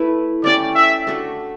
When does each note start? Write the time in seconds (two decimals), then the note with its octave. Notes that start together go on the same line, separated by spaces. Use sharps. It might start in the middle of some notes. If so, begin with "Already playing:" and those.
Already playing: A3 E4 B4
0.44 A3 C#4 G4 D5
0.76 E5
1.07 A3 D4 F#4 A4